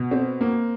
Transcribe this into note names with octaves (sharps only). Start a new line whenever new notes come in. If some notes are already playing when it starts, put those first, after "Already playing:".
Already playing: B2
C4
A#3